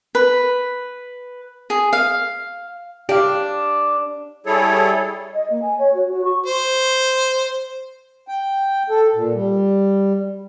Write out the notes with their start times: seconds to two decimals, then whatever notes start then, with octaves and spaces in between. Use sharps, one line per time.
0.15 B4
1.70 G#4
1.93 F5
3.09 D4 G4 F5
4.46 G3 E4 G#4 A4 C#5
5.34 D#5
5.50 A#3
5.61 G#5
5.78 C#5
5.94 F#4
6.11 F#4
6.24 C#6
6.46 C5
8.28 G5
8.90 A4
9.15 A#2
9.34 G3